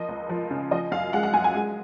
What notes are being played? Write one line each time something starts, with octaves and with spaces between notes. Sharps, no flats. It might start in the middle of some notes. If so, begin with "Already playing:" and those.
Already playing: F3 A#3 D#5
C#2
F3
C#3
F3 D#5
F#2 F5
G#3 F#5
F#5
F#2 G#5
G#5
G#3